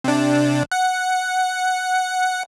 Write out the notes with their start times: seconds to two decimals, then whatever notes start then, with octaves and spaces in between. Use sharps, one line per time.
0.04 C3 D4
0.72 F#5